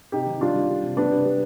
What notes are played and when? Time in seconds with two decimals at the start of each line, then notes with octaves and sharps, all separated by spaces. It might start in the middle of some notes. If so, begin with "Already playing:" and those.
0.12 C3 D#4 G4
0.26 D#3
0.41 G3 D4 F4
0.55 G3
0.70 G3
0.83 C3
0.97 G3 B3 D4
1.11 C3
1.25 G3